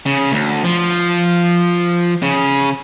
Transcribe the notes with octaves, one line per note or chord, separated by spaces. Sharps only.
C#3
D2
F3
C#3